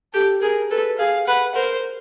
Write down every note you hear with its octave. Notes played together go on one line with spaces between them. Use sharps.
G4 A4
G#4 A#4
A4 B4
G#4 F5
B4 F#5
A#4 C5